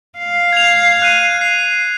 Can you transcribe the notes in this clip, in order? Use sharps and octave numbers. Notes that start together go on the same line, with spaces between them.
F5
G#6 F7
F#6 D#7
C7